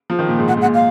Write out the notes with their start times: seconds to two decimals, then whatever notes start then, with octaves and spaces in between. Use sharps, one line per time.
0.10 F3
0.19 D#3
0.28 A#2
0.38 G#2
0.47 A#2 F#5
0.57 G#2
0.61 F#5
0.65 A#2
0.74 F5